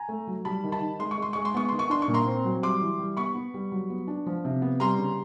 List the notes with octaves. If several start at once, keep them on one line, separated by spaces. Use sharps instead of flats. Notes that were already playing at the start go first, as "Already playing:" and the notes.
Already playing: G#5 A#5
A3
F#3
G3 A5 B5
D#3
A5 B5
D#3
G#3 C6
C#6
G#3 C6
G#3 C#6
C6
B3 C#6
D#3 C6
C#6
D4 C6
C#6
A#2
A#5 C6
C4
F#3
G3 C6 D6
E3
G3
B3 B5 C#6
B3
G3
F#3
B3
D4
F3
C3
B3
G3 A#5 C6
C#3